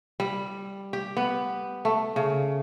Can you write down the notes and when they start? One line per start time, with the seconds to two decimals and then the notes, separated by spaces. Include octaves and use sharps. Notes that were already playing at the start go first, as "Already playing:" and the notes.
0.20 G3
0.93 G4
1.17 B3
1.85 A3
2.16 C#3